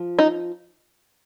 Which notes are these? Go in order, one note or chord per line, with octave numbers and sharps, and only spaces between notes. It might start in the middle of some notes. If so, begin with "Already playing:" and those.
Already playing: F3
D#4